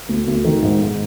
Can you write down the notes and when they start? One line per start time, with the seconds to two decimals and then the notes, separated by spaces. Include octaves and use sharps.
0.09 D2
0.28 D2
0.44 D#3
0.62 G#2
0.81 G#2